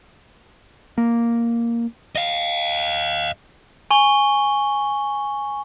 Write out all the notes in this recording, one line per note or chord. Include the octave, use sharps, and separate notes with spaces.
A#3
D#5 F5
G#5 C#6 G7